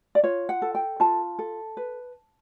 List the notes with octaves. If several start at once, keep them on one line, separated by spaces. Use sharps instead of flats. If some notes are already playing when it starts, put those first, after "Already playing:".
D5
F4 C#5
F#5
A4
G5
F4 A5
A4
B4